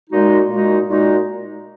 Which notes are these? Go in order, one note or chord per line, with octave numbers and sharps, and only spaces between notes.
A#2 G#3 D#4 F#4
A#2 G#3 D#4 F#4
A#2 G#3 D#4 F#4